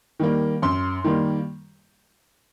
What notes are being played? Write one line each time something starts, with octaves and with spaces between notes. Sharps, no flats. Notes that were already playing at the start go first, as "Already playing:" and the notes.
D#3 G3 A#3
F#2 C6
D#3 G3 A#3